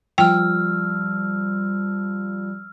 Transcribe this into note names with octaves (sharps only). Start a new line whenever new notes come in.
F3 G3 G5 E6 F6